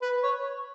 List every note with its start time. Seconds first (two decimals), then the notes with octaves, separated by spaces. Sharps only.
0.02 B4
0.23 C#5